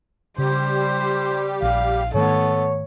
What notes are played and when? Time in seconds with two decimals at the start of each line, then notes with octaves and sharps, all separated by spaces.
0.38 C#3 G3 G4 C5
1.62 A#1 F5
2.14 G#2 D#3 A3 B3 A4 C#5